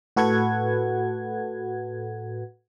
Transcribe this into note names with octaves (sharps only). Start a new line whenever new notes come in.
A2 F#4 A4 B4 F#5 G#6